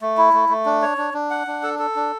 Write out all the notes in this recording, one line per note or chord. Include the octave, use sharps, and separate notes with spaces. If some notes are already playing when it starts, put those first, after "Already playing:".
A3
E4
A3
A3
D4
C#5
D4
D4
F#5
D4
A4
A4
D4